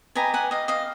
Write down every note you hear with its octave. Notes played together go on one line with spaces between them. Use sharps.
G4 B4 D#5 G#5 A#5
F#5 G#5
D#5 F5
D#5 F5